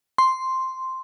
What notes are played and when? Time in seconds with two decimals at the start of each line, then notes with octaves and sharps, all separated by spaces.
0.18 C6